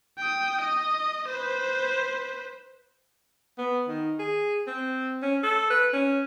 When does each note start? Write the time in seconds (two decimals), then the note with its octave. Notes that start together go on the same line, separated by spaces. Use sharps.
0.18 G5 D#6
0.61 D#5
1.28 B4 C5
3.58 B3
3.88 D#3
4.19 G#4
4.67 C4
5.22 C#4
5.43 A4
5.70 B4
5.93 C#4